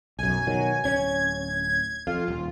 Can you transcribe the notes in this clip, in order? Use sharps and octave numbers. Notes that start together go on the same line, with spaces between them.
B1 F#2 G#5
B2 D#3 F#3
D1 C#4 G#6
F2 F4
D#1